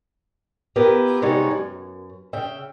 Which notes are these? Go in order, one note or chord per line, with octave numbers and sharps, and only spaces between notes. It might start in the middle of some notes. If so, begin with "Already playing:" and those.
B3 E4 F4 G4 A#4 B4
C3 G3 G#3 D#4 F#4 C#5
F#2
C#3 E5 G5